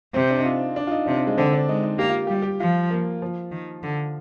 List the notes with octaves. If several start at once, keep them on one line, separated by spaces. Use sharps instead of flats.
C3 C4
D4
D#4
F4
D4
F4
D#4
C3 D4
C4
G#3
D3 C4
D4
G#3 D#4
D#4
A#3 G4
F4
G3 G4
F4
G4
F3 F4
A#3
F3
D#3
D3